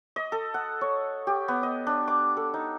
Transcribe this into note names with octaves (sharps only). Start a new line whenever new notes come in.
D#5
A4
F#5
C#5
G4
B3
D#5
D4
D6
A4
D#4